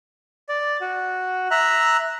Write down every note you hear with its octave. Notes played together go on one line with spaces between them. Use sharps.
D5
F#4
E5 A#5 F#6